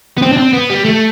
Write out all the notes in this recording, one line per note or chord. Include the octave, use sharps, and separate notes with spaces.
B3
C4
D4
C4
B3
G3
A3